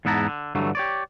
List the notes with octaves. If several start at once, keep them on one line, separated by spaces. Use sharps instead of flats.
E2 G#2 B3 E4 A5 A#5
D3
G2 D3 E3 F#3 A3
G4 C#5 D5